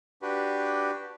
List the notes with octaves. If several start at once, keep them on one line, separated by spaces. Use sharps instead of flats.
D4 F#4 G4 B4